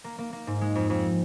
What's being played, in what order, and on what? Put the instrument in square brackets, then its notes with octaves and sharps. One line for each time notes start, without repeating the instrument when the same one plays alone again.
[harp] A#3
A#3
A#3
G#2
G#3
F2
F2